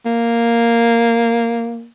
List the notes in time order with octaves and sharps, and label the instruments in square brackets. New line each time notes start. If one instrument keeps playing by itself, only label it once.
[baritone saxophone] A#3